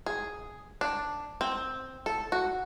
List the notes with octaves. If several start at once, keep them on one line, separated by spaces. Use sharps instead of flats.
G#4
D4
C4
A4
F#4